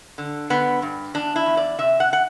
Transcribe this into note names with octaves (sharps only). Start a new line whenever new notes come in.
D3
D3 B3
G2
E2 D4
E4
E2
D5
C3 E5
F#5
F#5